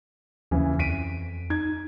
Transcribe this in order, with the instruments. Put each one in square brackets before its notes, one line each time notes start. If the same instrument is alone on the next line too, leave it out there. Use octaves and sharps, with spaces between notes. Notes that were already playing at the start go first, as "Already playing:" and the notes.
[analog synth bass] D#2 [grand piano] C#3 E3
[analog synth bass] F2 [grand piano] B6 D7 D#7
[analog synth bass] D#4 [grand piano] G#6